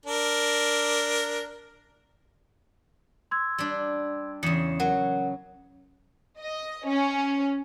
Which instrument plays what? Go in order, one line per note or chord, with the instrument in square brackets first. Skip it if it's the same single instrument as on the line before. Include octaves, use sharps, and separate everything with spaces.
[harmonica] D4 A#4
[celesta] C6 E6 G#6
[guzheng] G3 D4
[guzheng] E2 C#3 [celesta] C#7 E7
[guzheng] F#3 [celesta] A#4 F#5
[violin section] D#5
C#4